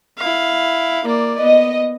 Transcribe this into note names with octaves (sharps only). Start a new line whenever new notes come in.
E4 F5
A#3 D5
B3 D#5